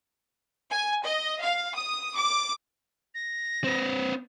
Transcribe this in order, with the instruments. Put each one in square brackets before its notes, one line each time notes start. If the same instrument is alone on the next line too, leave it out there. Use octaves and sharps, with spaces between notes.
[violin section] G#5
D#5
F5
D#6
D6
[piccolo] A#6
[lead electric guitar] C4 B4